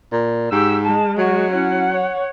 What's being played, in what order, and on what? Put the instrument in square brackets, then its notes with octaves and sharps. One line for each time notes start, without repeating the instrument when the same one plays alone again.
[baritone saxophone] A#2
[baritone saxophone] G#2 [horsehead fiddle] G4 [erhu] E6
[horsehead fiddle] G#3 [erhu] A5
[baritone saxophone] F#3 [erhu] F#4
[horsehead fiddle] C#4 E4 [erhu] F#5
[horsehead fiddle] C#5